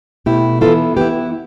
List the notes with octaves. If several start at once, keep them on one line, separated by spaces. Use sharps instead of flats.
B2 A3 E4 G4
E3 B3 E4 F4 A4
E3 B3 E4 G4 B4